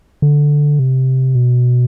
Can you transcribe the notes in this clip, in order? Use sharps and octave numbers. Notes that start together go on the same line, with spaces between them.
D3
C3
B2